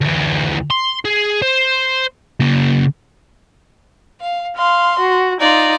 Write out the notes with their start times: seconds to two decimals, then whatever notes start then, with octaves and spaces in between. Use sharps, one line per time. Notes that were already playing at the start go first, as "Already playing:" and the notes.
0.01 D2 E3
0.71 C6
1.05 G#4
1.42 C5
2.40 C#3 A#3
4.21 F5
4.57 F5 C6
4.99 F#4
5.40 D#4 F4 D5